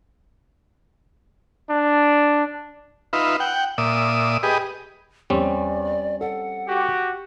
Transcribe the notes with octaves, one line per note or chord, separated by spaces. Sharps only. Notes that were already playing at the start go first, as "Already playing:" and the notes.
D4
D#4 F4 B4 E5
F#5 G5
A#2 D5 E5 D#6
G4 G#4 B4 D#5
E2 G3 C4 C#4 D5
A4 F#5
F#4 G4